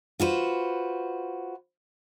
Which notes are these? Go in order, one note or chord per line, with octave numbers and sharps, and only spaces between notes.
F4 F#4 B4 C5